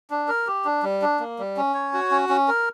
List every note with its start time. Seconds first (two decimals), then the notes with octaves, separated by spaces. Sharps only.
0.10 D4
0.28 A#4
0.47 G4
0.65 D4
0.83 G3
1.02 D4
1.20 A#3
1.39 G3
1.57 C#4
1.74 C#5
1.94 F#4
2.11 C#4
2.29 C#4
2.48 A#4